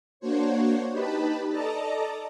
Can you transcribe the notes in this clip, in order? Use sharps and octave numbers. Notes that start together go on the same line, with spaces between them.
A#3 D4 F#4 C5 C#5
D#4 G4 B4 A5 B5
A4 D5 D#5 A5 A#5